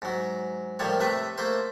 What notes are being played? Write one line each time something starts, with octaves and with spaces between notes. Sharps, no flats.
G#2 F#3
A2 D#3 F3 G3 C#5
C3 A3 B4 E5
A3 A#3 C5